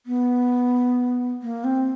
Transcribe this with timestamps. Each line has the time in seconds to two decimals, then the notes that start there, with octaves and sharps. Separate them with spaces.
0.06 B3
1.42 A#3
1.64 C4